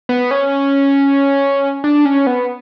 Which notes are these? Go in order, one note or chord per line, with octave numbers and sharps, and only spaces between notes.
B3
C#4
D4
C#4
B3